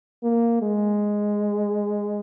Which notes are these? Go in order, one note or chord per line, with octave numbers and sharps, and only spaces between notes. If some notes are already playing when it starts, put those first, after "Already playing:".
A#3
G#3